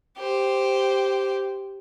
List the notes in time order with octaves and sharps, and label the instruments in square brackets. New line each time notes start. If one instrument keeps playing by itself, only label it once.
[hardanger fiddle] G4 C5